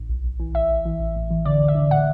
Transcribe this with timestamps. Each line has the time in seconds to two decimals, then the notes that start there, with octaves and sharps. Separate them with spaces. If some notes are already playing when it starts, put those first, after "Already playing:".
Already playing: A1
0.09 B1
0.24 B1
0.39 E3
0.54 A1 E5
0.70 A1
0.85 E3
1.00 A1
1.15 A2
1.31 E3
1.45 D3 D5
1.60 D2
1.68 E5
1.75 D3
1.90 A2 F#5